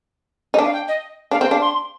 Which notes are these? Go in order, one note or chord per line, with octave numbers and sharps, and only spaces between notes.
D#4
D4
F5
G5
D#5
D4 F5
C4 G5
D4 F5
C6